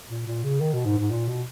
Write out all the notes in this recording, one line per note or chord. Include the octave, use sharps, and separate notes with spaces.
A#2
A#2
C#3
D#3
B2
G#2
G#2
A#2
B2